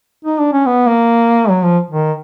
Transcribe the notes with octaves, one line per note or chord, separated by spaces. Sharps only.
D#4
D4
C#4
B3
A#3
F#3
F3
D#3